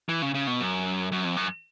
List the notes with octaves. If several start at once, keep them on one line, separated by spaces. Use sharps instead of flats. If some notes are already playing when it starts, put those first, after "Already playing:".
E3
C#3
C#3
B2
F#2
F#2
F2
F#2